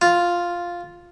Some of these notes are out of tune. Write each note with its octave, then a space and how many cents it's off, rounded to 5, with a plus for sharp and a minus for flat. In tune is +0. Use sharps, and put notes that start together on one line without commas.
F4 +0